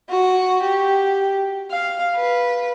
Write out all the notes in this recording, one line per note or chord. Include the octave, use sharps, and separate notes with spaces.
F#4
G4
F5
B4